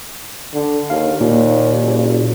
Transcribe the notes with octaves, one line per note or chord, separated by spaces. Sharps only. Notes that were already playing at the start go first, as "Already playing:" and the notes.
D3
D#2 F5
D#2 A#2
F#1